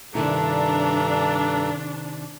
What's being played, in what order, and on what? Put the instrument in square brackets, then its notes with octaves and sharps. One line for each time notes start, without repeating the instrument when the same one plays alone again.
[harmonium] G2 A4 A#5 [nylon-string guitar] C3 D#3 E4 [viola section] D4